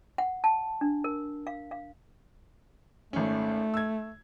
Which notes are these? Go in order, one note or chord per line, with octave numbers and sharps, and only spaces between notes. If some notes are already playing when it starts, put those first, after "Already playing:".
F#5
A5
D4
A#4
F5
F5
G#1 A3 C#4
E6 G#6